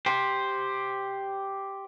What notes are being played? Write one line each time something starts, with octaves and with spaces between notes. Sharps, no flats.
G4 C5